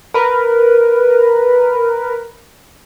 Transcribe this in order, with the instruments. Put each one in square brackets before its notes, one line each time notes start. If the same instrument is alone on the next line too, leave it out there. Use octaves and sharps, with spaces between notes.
[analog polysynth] A#4 B4